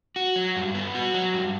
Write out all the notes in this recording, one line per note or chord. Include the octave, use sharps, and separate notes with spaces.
F#4
F#3
G2
B3
F#4
F#3
G2